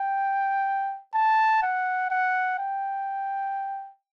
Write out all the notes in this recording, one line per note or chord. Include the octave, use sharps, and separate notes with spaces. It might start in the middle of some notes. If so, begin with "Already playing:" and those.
Already playing: G5
A5
F#5
F#5
G5